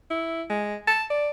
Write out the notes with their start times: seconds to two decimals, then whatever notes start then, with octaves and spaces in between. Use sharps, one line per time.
0.10 E4
0.50 G#3
0.87 A5
1.10 D5